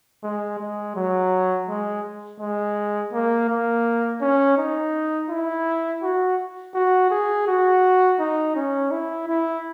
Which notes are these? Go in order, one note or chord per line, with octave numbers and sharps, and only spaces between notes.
G#3
G#3
F#3
G#3
G#3
A#3
A#3
C#4
D#4
E4
F#4
F#4
G#4
F#4
D#4
C#4
E4
E4